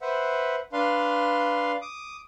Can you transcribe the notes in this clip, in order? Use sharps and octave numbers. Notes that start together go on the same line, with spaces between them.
B4 C5 E5 F#5
D4 B4 F5 C6
D6 D#6